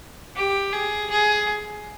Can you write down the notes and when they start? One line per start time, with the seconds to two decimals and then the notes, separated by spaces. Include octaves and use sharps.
0.36 G4
0.73 G#4
1.10 G#4